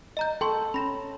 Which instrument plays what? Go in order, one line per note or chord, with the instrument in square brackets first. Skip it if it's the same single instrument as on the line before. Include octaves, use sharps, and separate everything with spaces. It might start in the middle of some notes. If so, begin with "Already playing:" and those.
[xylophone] D#5 A#5 G6
[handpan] A4 [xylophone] G5 C6 C#6
[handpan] C#4 [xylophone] B5 A#6 E7